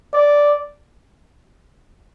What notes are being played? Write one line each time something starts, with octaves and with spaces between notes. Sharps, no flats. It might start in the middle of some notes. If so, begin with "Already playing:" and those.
D5